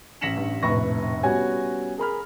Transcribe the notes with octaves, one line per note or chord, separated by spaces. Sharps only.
A1 A#6 B6 C#7 E7 F#7
A1 G2
F1 A#1 A2 B4 C#6 A#6
G3 B3 C#4 F#4 G#5 G#6
G#4 A#4 B5 F6